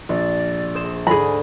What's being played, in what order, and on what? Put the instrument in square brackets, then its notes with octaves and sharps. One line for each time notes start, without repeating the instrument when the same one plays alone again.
[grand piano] A#1 [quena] D5
[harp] G#4 C5 E7
[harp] D2 G#2 A#6 [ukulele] G#4 B5 [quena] G#5